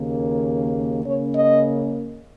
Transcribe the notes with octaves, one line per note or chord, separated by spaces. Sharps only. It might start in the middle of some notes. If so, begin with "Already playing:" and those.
Already playing: D#2 C#3 A#3
C#3 A#3 C#4 C#5
D#5